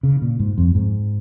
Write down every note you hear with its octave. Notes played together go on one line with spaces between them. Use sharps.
C#3
A#2
G#2
F2
G#2